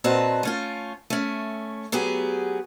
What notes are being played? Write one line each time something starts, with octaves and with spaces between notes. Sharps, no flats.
A#2 C4 F#4 B4 D#5 A5
A3 C#4 F4
A3 C#4
F#3 B3 G4 G#4